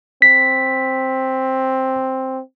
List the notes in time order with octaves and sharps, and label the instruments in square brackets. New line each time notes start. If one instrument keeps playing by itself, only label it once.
[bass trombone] C4 [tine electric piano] B6